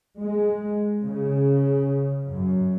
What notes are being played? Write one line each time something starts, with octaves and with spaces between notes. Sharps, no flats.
G#3
C#3
F#2